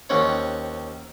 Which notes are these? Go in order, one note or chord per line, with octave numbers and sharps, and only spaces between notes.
D#2 C4 C#4 C#5 F#5